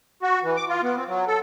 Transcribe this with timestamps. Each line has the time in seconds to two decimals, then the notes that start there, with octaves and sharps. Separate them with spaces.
0.22 F#4
0.43 E3
0.57 D6
0.69 F4
0.83 B3
0.97 C4
1.08 F#3
1.28 A4